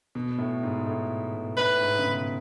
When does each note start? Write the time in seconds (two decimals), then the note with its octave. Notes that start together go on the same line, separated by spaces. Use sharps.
0.15 B2
0.38 A2
0.63 G#2
0.86 A2
1.34 B2
1.57 A2 B4
1.81 G#2
1.98 C#3
2.05 B2